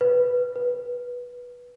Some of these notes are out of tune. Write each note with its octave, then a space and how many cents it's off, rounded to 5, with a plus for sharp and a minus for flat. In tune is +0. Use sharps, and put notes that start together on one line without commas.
B4 -5
B4 -15